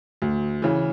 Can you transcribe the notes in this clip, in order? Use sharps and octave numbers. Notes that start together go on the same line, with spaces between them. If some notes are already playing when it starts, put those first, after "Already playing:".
D2
C#3 E3